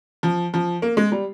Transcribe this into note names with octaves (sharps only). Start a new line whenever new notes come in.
F3
F3
A#3
G#3
G3